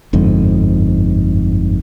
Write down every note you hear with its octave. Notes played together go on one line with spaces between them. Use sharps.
G1 F2 G#2